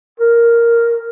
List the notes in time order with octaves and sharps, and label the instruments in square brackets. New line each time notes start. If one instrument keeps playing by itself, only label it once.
[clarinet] A#4